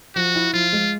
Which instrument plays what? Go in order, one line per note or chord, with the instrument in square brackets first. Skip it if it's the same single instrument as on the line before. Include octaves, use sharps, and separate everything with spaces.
[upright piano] F3 [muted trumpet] F#4
[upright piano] E4
[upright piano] F3 [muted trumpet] F4
[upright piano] G#3